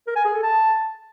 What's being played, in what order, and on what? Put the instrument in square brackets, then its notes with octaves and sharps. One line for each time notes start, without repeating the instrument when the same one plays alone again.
[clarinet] A#4
G#5
G#4
A4
A5